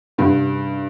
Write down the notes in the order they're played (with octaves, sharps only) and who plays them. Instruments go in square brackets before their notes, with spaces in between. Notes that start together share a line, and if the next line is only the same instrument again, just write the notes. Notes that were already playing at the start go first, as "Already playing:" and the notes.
[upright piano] G2 [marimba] C3 G3 D4